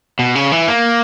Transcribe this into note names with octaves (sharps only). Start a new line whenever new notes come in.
B2
C#3
E3
A#3